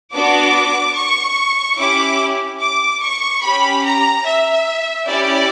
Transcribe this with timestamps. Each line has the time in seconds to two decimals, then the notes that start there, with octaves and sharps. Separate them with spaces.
0.14 B3 D4 F#4 D6
0.96 C#6
1.78 C#4 E4 G4 D6
2.61 D6
3.01 C#6
3.43 C#4 G4 B5
3.85 A#5
4.26 E5
5.07 C#4 E4 G4 D5